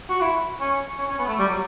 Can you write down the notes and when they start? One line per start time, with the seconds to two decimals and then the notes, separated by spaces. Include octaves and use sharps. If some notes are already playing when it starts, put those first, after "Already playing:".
0.10 F#4
0.21 E4
0.61 C#4
0.99 C#4
1.10 C#4
1.19 B3
1.28 A3
1.39 G3
1.49 F#3